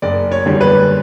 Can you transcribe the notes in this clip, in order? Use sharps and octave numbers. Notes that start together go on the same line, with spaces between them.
F#1 D5
C#5
E2 D3 G3
B4